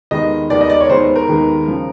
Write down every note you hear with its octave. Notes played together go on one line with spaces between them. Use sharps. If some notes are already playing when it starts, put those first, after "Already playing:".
D#2 D#3 G#3 B3 D#5
D#2 D#3 G#3 B3 D5
D#5
D5
C#5
D#2 D#3 G#3 B3 C5
A#4
D#2 D#3 G#3 B3
C#3 F3